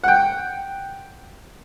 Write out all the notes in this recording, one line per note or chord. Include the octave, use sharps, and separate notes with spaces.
F#5 G5